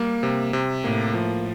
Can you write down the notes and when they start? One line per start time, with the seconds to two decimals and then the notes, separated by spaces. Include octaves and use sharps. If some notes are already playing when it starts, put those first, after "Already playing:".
Already playing: G3 A#3
0.23 C3
0.53 C3
0.84 A2 A#3
1.14 F3